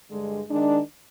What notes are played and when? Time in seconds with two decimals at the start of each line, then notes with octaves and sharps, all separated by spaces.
0.10 G2 D3 G#3
0.49 D#3 G#3 D4